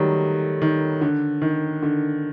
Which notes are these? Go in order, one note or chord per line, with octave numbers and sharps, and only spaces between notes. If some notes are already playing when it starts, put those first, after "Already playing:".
Already playing: D#3 F#3 G3 A3
D#3
D3
D#3
D3